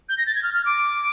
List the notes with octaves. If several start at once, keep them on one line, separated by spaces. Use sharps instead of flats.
G6
A#6
A6
G#6
F6
F6
D6